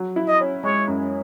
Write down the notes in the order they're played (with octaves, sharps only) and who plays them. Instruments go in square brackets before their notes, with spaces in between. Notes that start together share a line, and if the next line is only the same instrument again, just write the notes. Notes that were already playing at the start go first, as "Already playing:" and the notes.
Already playing: [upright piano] F#3
E4
[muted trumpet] D#5
[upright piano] C#4
[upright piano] G#3 [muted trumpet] C#5
[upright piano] F#2